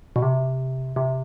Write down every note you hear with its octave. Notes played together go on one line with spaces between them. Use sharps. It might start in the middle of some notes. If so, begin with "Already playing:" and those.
B2
C3
C3